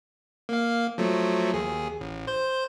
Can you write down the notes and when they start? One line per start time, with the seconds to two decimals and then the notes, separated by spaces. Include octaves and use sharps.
0.49 A#3 F5
0.98 F3 F#3 A3
1.54 D#2 G#4
2.01 A1
2.27 C5 G6